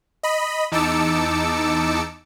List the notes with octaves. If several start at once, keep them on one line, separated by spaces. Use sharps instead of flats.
D#5 B5
E2 D#4 A5 D6 E6 C#7